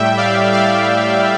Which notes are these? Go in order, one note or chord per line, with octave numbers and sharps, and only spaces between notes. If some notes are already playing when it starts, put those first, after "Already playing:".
Already playing: A2 G3 E5 G5
D5 F5
D5 F5